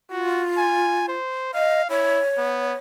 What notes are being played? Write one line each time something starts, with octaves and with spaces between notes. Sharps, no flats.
F4 F#4
G#5
C5
D#5 F5
E4 C#5
B3